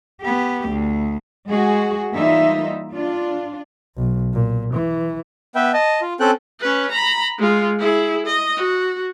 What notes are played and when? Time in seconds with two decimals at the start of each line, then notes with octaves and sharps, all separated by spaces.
0.22 B3 G4
0.69 D2
1.48 G#3 F#4 G#4
2.14 E3 G3 A#3 D#4 F4 E5
2.94 D4 F4
3.97 B1
4.33 A#2
4.74 E3
5.55 B3 B4 E5 G5
5.74 D#5 A5
6.01 F4
6.20 C4 C#4 A4 G5 F#6
6.60 C#4 B4
6.92 A#5 B5
7.38 G#3 F4
7.79 E4 G#4
8.26 D#5
8.57 F#4